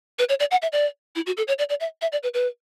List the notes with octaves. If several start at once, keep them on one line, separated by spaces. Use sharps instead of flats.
B4
C#5
D5
F#5
E5
D5
E4
F#4
A4
C#5
D5
D5
E5
E5
D5
B4
B4